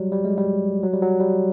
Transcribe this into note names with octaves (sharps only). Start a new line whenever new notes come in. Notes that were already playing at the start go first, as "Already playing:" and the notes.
Already playing: F#3 G3
G3
G#3
G3
F#3
G3
F#3
G3